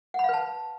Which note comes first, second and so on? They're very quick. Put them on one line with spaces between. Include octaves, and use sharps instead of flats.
F#5 B5 F5 B4 A5